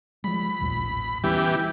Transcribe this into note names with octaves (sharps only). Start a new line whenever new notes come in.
F3 G3 G#3 B5
A1 D#2 A#2
E3 G3 B3 C#4 G4